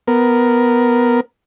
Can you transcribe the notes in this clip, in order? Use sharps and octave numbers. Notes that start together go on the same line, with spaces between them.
B3 A#4